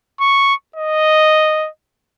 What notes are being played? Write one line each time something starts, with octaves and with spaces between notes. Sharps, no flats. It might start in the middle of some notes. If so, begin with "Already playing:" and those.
C#6
D#5